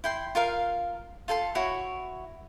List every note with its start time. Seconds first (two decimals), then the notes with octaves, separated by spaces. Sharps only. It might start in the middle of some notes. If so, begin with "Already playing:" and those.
0.04 E4 G5 C6
0.35 F4 A#4 F5
1.28 F4 A4 G#5 C6
1.55 E4 F#4 C#5 E5